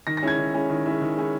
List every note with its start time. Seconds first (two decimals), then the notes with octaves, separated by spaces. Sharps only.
0.07 D#3 A#6
0.17 A#6
0.23 G#3 C#4 E4 G#6
0.38 D#3
0.54 G#3 C#4 E4
0.70 D#3
0.86 G#3 C#4 E4
1.01 D#3
1.17 G#3 C#4 E4